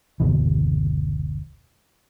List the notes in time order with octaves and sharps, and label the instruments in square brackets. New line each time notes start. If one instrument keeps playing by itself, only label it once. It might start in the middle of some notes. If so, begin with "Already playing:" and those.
[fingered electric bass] F#1 D2 B2 E3